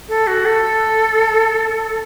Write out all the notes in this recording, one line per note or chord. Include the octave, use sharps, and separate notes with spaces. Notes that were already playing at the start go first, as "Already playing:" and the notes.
A4
F#4
A4